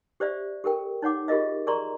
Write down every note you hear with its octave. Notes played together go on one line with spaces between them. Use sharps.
G4 C5 D5 E5
G4 A4 A#4 G5
D#4 C#5 F#5 D6
F4 G4 G#4 A#4 D#5 E5
G#4 A#4 D5 A#5 C6 C#6